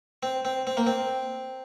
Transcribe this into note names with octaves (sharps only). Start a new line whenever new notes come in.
C4
C4
C4
A#3
C4